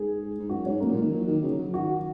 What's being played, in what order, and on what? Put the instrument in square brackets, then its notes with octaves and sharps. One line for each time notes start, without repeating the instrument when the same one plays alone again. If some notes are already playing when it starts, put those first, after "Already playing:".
Already playing: [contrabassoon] G#2 [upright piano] G#4
[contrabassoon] G#2
[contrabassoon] F#2 [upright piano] F#4
[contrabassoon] G#2 [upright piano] C#4
[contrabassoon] F#2 [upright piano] A#3
[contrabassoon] A#2
D#3
F#3
D#3
C#3
F#3
[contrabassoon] D#3 [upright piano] F#4